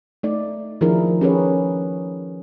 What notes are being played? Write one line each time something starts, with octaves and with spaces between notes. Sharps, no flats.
A3 D#4 D5
D#3 F3 D4 E4 G#4 A#4
C#4 G4 G#4 A#4 B4 C#5